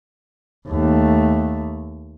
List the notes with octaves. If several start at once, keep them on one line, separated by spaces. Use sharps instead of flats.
D#2 A3